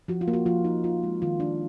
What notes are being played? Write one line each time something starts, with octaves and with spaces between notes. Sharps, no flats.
F3 F#4
F4
A#3
F#4
F3 F4
D#4
F4
G#3
D#3 F4
D4